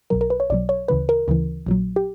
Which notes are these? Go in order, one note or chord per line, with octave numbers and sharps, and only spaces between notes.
B1 B2 F#3 A#4
A#4
B4
C#5
B1 B2 F#3 D5
C#5
D2 C#3 E3 B4
A#4
D2 C#3 E3
A#1 A#2 F#3
G4